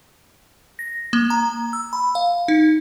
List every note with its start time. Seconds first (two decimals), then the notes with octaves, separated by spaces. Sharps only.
0.79 A#6
1.13 A#3
1.30 A#5
1.73 E6
1.93 B5
2.15 F5
2.48 D#4